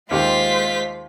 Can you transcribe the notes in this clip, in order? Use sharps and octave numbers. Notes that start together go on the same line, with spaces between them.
D#2 G#3 F4 G4 C5 B6